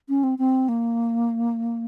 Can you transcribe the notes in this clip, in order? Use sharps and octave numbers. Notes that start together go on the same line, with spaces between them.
C#4
C4
C4
A#3